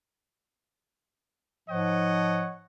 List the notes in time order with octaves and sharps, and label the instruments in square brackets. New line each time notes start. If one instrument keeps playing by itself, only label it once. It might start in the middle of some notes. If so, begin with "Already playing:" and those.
[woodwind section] G#2 F3 [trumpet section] C#5 D#5 F#5